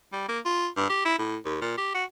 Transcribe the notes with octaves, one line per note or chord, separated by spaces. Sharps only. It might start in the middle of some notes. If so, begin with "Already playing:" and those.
G3
A#3
F4
G2
G4
E4
A2
D#2
A#2
G4
F#4